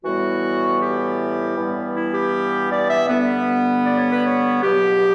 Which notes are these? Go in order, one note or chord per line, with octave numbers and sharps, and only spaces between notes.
A2 E3 G3 B3 F#4
G4
G2 E3 G3 B3
E4
G4
D5
E5
G2 D3 G3 B3
D5
C#5
B4
C#5
C#2 B2 F#3 B3 G4